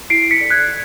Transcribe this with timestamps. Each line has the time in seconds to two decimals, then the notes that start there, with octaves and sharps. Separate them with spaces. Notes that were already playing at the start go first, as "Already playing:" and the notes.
0.10 E4 C7 D7
0.31 B6 C#7
0.41 A4 D5
0.50 F#6 G#6